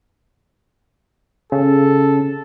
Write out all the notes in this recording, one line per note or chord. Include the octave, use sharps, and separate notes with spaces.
C#3 A4